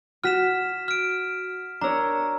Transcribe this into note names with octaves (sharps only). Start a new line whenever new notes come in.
F#4 F6 B6 D#7 E7
F6 D7
D4 A#4 C#5 A#5 E6